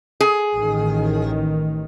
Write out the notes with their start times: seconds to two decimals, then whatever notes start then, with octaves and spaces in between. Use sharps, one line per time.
0.21 G#4
0.56 A1 D#3